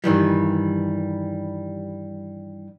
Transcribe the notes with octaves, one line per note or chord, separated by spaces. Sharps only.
G2 D#3 E3 G3